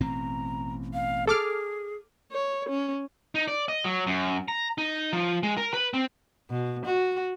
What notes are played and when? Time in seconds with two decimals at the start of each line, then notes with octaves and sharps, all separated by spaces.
0.01 A1 B2 C4 A#5
0.94 F5
1.27 G#4 A4 D6 F6
2.32 C#5
2.69 C#4
3.35 D#4
3.48 D5
3.68 D#5
3.84 F#3
4.07 F#2
4.48 A#5
4.78 D#4
5.13 F3
5.43 G#3
5.57 A#4
5.74 B4
5.94 C4
6.50 B2
6.86 F#4